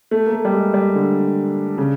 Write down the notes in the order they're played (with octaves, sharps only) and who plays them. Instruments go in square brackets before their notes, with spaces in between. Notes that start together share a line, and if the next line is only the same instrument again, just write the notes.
[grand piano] A3
A#3
A3
G3
G#3
G3
D3
C#3